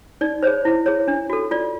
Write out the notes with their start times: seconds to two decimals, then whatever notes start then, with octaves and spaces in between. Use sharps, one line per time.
0.21 D#4 D5
0.43 G#4 C5 C#5
0.65 E4
0.86 G#4 C#5
1.08 D4
1.30 F#4 A4
1.51 F4 D5